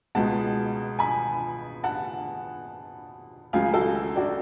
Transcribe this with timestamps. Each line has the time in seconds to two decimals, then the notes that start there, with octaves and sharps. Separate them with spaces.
0.15 C#2 B2 G#3 F#5 A5
0.99 G#5 B5
1.84 F#5 A5
3.53 C#2 C#3 F#3 F5 G#5
3.74 F#4 A4
4.16 D4 F#4